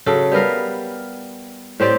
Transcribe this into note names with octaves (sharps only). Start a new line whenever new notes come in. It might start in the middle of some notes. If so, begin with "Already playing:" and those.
C#3 F#3 A4
G3 B3 A#4 F5
A2 C4 G4 D5